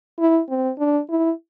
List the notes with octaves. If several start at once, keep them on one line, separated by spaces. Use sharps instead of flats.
E4
C4
D4
E4